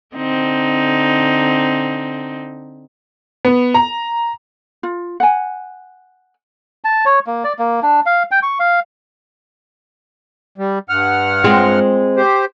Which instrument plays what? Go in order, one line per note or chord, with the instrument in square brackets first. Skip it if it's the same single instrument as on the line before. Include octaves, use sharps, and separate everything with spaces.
[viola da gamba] D3 C4 D#4
[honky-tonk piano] B3
A#5
[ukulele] F4
F#5 G#5
[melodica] A5
C#5
A#3
D5
A#3
D4
F5
G5
C#6
F5
[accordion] G3
G2 F#5 F6
[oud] G#3 C4 F4
[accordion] G4 C5